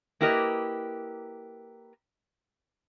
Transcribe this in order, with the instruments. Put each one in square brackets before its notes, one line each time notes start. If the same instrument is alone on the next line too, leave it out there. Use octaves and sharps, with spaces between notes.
[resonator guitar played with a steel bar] A#3 E4 G4 A#4 B4 D#5